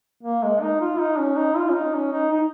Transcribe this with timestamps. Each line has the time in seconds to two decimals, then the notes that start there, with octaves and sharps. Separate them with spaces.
0.23 A#3
0.43 G#3
0.61 D#4
0.81 F4
0.99 D#4
1.19 C#4
1.37 D#4
1.57 F4
1.69 C#4
1.75 D#4
1.95 C#4
2.12 D#4
2.32 D#4